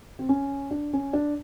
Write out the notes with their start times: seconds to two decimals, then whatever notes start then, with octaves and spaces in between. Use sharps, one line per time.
0.19 C4
0.29 C#4
0.71 D4
0.93 C#4
1.13 D4